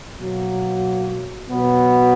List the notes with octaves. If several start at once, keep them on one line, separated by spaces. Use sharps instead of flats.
B2 F#3 A#3
B2 F#3 B3